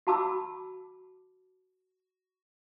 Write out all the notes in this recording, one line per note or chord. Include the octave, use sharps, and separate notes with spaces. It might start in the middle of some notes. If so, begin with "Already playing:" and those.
F#4 F5 A5 B5 D6 E6